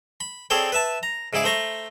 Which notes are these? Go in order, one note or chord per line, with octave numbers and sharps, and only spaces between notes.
B5
C4 G#4 A4 C#5 D5 G5
B4 E5 A5
A#5
G#2 C#3 E4 G#4 D6
A3 C5 A#5 C#6